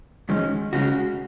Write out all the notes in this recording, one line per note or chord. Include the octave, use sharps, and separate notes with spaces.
F#2 D#3 G#3 C#4
C#2 C#3 G#3 C#4 F#4